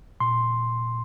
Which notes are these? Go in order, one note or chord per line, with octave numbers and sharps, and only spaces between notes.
A#2 C6